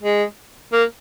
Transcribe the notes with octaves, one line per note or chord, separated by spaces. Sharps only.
G#3
A#3